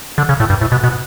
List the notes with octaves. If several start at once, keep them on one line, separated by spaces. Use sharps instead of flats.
D3
C#3
A2
G2
A2
B2
B2